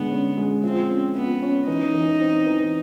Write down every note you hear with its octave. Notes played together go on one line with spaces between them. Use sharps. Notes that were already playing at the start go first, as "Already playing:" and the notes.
Already playing: D3 G#3 B3
C#4
G#3
F3 C4
C#4
F3 B3
C#4
E3 D#4
E3
C4
E3